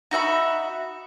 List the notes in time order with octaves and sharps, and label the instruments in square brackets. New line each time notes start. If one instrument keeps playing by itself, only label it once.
[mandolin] D#4 F#4 E5 B5